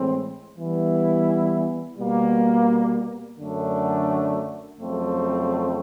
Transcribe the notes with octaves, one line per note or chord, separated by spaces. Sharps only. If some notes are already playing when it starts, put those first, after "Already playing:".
Already playing: A2 E3 G#3 C4
E3 G3 B3 E4
B2 G3 A#3
F#2 D3 F#3 A3 D4
F2 C#3 F#3 A3 C4